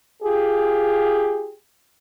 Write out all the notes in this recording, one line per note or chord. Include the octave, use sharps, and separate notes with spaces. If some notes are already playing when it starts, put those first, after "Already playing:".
F4 G4 G#4